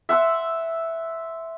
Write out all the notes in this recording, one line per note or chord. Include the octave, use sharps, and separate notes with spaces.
E5 F#5 C6 E6